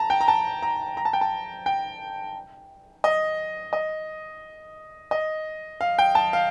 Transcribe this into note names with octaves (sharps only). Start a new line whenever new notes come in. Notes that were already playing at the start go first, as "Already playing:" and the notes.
Already playing: A5 A#5
G5
A#5
A5
A#5
A#5
A5
G5
A5
G5
D#5
D#5
D#5
F5
G5
A5
F5